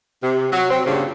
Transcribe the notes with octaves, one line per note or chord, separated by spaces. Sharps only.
C3
F#3
F#3 C4
G2 A#2 C#3